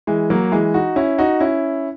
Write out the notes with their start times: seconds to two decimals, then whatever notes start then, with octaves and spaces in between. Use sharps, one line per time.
0.07 E3 G#3
0.30 F#3 A#3
0.52 E3 G#3
0.74 D#4 F#4
0.96 C#4 E4
1.18 D#4 F#4
1.40 C#4 E4